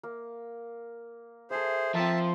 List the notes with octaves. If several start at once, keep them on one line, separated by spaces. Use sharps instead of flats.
A#3
G#4 A4 C5 E5
F3 C4 E5 A5 A#5